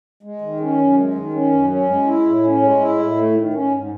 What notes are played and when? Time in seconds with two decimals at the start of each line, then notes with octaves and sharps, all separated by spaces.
0.23 G#3
0.41 D#3
0.60 C#4
0.78 F#2
0.97 G#3
1.15 D#3
1.34 C#4
1.51 F#2
1.70 C#4
1.89 G#3
2.06 E4
2.25 A2
2.44 C#4
2.62 G#3
2.80 E4
2.99 A2
3.17 A3
3.35 D#3
3.54 C#4
3.72 G#2